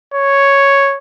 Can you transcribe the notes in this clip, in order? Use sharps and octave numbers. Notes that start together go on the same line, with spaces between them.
C#5